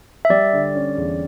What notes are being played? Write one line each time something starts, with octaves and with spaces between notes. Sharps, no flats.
E5
G3 D5
D3
C#4
E2